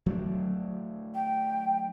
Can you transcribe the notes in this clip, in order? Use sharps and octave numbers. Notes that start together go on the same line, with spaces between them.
F#3 A3 D4
G5